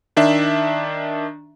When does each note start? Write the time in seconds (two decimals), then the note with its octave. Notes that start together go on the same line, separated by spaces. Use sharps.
0.16 D#3 D4 E5